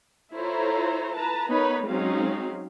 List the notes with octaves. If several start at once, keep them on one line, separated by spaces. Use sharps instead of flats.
E4 F4 A4 C5 C#5 A#5
B4 A5 A#5
B3 D#4 A#4 B4 C#5 B5
F#3 G#3 C4 C#4 D#4 F5